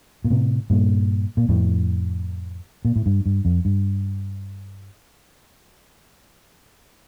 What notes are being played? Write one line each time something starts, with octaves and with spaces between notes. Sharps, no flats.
A#2
A2 C3
G2 A#2
A#2
F2 A2
A#2
A2
G2
G2
F2
G2